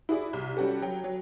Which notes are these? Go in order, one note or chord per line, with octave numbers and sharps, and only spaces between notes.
E4 F#4 G#4 D5
C2
G3 C#4 F#4 G4 A4
F#3 G5
F#3